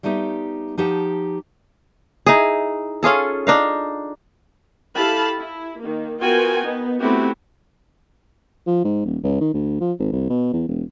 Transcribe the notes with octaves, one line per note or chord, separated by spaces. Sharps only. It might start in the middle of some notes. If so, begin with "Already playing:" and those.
G3 A3 B3 D#4 G4
F3 D#4 G4 F#5 A5
D#4 E4 G#4
C#4 F4 G#4 A4
D4 D#4 F5
E4 G4 A4 F5 A5 B5
E4
D#3 A#3
B3 F4 F#4 A#4 G5 G#5
B3 D#4
A3 B3 C4 E4 F#4 G4
F3
G#2
D#1
C#2
D#3
D2
F3
G#1
C2
B2
E2
E1